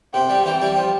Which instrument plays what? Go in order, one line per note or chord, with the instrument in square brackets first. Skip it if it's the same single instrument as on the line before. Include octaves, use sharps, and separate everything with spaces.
[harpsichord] C3 [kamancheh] G5
[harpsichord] G3
[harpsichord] E3 [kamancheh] G5
[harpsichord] G3
F3